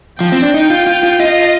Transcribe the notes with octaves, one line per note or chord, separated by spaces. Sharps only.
F3 G5
C4
D4
D#4
F4
F4
F4
F4 D#5